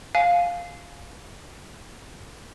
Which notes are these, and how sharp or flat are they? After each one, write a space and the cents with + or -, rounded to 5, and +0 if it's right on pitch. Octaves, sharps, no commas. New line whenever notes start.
F5 +0 G#5 +25